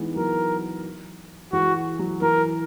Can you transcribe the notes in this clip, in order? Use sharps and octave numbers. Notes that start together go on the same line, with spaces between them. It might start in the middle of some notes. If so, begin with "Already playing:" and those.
Already playing: E3 G#3 B3 D#4
F#3 A#4
E3 G#3 F#4
F#3
E3 A#4